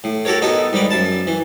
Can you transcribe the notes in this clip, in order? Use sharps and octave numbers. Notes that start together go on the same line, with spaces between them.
A2
F#4 G4 A4 A#4 C#5
A2 B3 D#4 A4 D#5
G#2 G3 A#4 B4
F#2 A5
E3